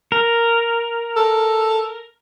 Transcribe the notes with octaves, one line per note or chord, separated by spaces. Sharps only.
A#4
A4